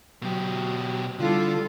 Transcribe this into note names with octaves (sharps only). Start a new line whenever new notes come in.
B2 F#3 G4
D3 G3 E4 F4 A4